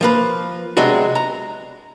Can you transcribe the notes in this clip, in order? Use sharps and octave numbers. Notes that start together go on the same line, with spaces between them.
F3 A#3 B4
C3 F#3 G#3 B3 D4 F#4
A#5